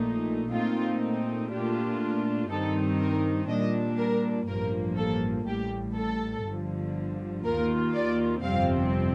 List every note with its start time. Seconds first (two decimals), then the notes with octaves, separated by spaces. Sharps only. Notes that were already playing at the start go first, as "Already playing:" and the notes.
Already playing: A#1 A#2 A3 D#4
0.52 A#2 A3 C4 D#4 F4
1.51 A#2 A3 D4 F4 G4
2.50 G2 D#3 G3 C4 D#4 A4
3.00 A#4
3.49 A#2 G3 D4 D#5
3.99 A#4
4.48 A1 G2 F3 A#3 A#4
4.97 A4
5.47 A1 A2 G3 G4
5.96 A4
6.45 G1 G2 D3 F3
7.45 D#2 D#3 A#3 F4 A#4
7.94 D5
8.43 G1 F2 C3 G3 C4 F5